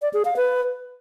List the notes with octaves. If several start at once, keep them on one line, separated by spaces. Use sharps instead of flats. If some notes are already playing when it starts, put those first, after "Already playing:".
D5
G#4
F5
B4